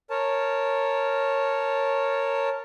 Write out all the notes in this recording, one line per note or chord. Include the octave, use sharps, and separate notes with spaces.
A#4 C#5 A5